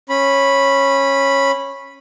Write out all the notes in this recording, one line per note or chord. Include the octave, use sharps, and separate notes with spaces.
C#4 B5